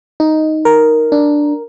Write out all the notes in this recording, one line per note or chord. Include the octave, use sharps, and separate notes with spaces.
D#4
A#4
D4